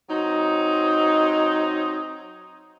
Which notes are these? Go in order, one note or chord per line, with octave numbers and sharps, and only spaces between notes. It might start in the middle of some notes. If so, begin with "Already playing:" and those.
F#3 C4 D#4